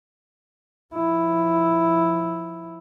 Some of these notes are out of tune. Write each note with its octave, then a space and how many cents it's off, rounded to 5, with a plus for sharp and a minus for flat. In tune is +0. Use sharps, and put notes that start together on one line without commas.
F3 +0 E4 +0